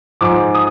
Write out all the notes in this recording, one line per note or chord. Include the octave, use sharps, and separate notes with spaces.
G#2 F3 D6
D#6